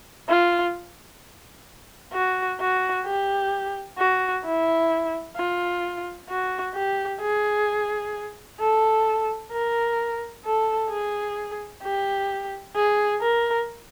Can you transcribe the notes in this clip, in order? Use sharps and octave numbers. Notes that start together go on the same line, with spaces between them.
F4
F#4
F#4
G4
F#4
E4
F4
F#4
G4
G#4
A4
A#4
A4
G#4
G4
G#4
A#4